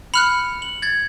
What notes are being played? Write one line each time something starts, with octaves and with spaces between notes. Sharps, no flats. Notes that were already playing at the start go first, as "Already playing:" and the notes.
B5 F6 F#6 C#7 F7
F#7
G#6 A6